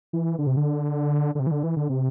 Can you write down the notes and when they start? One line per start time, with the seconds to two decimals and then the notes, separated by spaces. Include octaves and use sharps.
0.13 E3
0.38 D3
0.47 C3
0.57 D3
1.35 D3
1.40 C3
1.47 E3
1.51 D3
1.63 E3
1.76 D3
1.89 C3